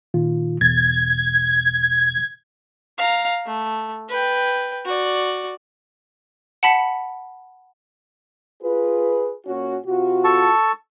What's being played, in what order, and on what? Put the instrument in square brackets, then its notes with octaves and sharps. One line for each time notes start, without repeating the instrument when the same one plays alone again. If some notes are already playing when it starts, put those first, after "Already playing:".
[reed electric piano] A#2 D#3 F4
[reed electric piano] E2 B2 A6 [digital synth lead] G#6
[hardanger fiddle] F5 A#5
A3
B4 G5
F#4 D5
[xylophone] F#5 A5 B5 B6 C#7
[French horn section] F4 G#4 B4
A#2 C#4 F#4
C3 F4 F#4
[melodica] A4 A5 C#6